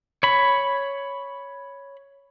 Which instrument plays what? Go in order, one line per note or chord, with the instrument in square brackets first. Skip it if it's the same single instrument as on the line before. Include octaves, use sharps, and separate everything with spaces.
[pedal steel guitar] C#5 B5